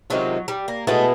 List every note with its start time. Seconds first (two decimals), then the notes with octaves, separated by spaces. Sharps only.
0.10 C3 D#3 F#3 G#3 C#4 F4
0.48 G3
0.68 A#3
0.87 B2 G#3 A3 B3 E4 G#4